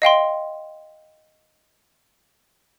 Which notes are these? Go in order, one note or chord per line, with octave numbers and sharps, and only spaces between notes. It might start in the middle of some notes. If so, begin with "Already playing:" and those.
D#5 F5 G5 C6